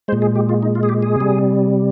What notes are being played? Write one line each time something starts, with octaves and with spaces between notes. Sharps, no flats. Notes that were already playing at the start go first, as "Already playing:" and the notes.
A#2 G#3 C5
G#4
G4
F4
D#4
F4
G#4
G4
G#4
C3 G3